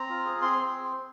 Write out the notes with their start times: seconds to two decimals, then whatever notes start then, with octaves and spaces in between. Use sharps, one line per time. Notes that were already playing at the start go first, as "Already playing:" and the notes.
Already playing: C4 A#5
0.10 F4
0.25 G#4
0.42 C4 C6
0.53 C6
0.58 C4